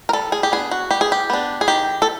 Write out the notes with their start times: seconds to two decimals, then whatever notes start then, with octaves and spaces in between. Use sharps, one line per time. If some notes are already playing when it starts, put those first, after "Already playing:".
0.09 A#4
0.13 G3 A4
0.32 G#4
0.43 G4
0.52 B3 D4 G#4
0.71 F#4
0.91 G3 G4
1.01 G#4
1.12 G4
1.30 B3 D4
1.61 G#4
1.68 D#3 G4
2.02 A4